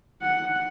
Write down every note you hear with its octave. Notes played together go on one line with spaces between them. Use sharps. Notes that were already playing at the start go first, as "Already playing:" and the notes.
F#5